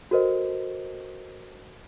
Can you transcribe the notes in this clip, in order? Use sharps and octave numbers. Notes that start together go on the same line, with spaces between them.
F#4 A4 A#4 C5 D#5